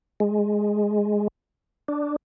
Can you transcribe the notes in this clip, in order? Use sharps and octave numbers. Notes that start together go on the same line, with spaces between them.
G#3
D4